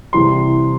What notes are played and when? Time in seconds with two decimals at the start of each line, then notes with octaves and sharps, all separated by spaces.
0.13 C2 C3 E3 G3 C6